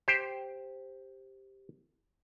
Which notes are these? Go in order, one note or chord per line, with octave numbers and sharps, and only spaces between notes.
G4 C5